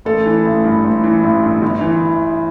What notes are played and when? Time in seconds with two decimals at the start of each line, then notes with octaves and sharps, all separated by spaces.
0.05 A1 A4
0.26 E3
0.45 A1
0.64 G2
0.84 A1
1.04 E3
1.23 A1
1.43 G2
1.62 G1
1.81 E3